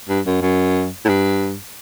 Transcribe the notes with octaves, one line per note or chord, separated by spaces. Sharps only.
G2
F#2
F#2
A2
G2